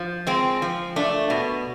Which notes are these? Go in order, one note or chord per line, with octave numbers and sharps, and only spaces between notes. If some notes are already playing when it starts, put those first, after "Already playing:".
Already playing: F3
G#3 C4
F3
A3 D4
B2